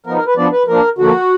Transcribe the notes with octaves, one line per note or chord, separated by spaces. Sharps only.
F3 B3 D#4 A#4
A#4
B4
F3 B3 D4 D5
B4
F3 A#3 D4 A#4
D3 F3 A#3 F#4